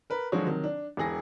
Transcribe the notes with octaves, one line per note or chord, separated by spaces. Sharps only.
A#4 B4
D3 F3 F#3 G#3 F#4 C#5
C3 D#3 F#3
D4
E1 E3 G#4 A#6